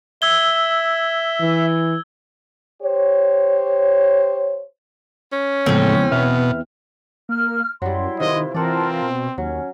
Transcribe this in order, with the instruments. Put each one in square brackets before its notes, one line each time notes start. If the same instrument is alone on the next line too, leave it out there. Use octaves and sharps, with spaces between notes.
[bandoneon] E5 [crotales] E6 G#6 G7
[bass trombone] E3
[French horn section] G4 C5 C#5
[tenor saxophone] C#4
[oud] E2 C4 [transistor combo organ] A2 [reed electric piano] C#3 F3 G#3
[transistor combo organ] B2 [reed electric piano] B4 E5 F6
[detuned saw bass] A#3 [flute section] F6
[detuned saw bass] F#2 [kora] F#3 G3 [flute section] E4 C6
[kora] C3 F4 B4 [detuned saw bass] D#3 [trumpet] D#5
[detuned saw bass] E3 [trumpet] C4 [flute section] F4 A#4 A5 [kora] D5 F#5
[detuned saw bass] B2
[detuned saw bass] D#2 [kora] F#3 [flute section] C#4